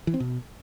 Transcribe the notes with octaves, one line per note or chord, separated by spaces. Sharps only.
E3
C4
B2